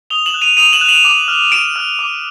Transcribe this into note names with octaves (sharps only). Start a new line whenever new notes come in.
D#6 F7 G7
E7 F#7
F#6
D#7 F7
D#6 D#7 F7
E7 F#7
F#6
E7 F#7
D6
F6
D6 D7 E7
F6
D6